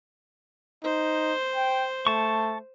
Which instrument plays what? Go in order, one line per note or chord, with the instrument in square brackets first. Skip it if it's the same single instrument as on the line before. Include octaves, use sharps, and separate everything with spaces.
[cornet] D#4 [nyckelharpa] C5
[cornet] G5
[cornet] A3 [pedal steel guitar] A5 C#6